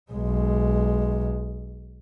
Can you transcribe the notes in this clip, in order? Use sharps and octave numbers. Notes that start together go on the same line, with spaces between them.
B1 G#3